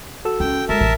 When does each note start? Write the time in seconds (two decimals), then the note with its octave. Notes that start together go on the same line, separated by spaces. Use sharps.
0.25 F#4 A4 E6
0.40 C#2 G5
0.69 G#3 A#4 E5 A5
0.81 A1 C3